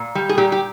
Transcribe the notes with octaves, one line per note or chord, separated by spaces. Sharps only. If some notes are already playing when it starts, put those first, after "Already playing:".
Already playing: A#2
G3
G#4
A#2 G4
G4